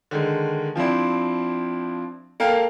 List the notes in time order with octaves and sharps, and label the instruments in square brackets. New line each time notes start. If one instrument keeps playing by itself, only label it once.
[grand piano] D3 D#3 G#3
F3 C4 D4 E4
A#3 A4 F5 G5